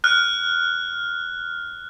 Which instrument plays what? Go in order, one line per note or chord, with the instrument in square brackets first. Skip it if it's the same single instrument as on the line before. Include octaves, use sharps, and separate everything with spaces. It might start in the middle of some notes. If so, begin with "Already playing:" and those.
[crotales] F6 F#6